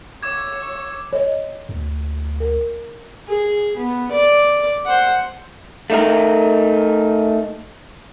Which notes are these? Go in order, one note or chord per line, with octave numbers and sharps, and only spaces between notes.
C#5 D6 E6 G#6
C#5 D#5
D2
A#4
G#4
B3
D5
C5 F#5
A3 D#4 A#4